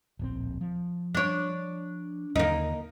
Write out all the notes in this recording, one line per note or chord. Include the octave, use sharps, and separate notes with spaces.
D1 A#1 C4
F3
D4 C#5
D#2 D3 A#3 D#4